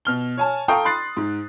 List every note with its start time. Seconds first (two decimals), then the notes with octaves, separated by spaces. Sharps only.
0.05 B2 F6 G7
0.37 C#5 G#5 A5
0.68 A4 F5 G5 A#5 C#6 D#6
0.85 B5 C6 F#6 A6 C7
1.17 G#2